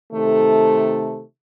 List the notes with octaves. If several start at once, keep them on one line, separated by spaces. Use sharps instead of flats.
C3 D#3 A3 A4